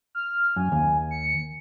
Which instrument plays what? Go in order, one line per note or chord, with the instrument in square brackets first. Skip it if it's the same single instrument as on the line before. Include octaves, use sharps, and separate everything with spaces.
[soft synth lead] F6
[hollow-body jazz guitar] F#2 [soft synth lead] G#5
[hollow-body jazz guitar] D#2
[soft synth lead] C#7